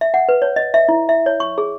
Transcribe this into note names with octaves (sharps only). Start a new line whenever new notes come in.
E5
F#5
B4
C#5
D#5
E5
E4
E5
C#5
C#6
G#4